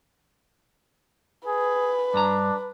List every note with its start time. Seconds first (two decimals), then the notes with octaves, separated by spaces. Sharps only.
1.47 G#4 B4
2.14 G2 D4 A#5